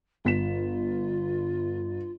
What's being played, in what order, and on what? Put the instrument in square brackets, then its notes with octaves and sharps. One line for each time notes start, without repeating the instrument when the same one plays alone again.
[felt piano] G1 B6 E7 [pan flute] F4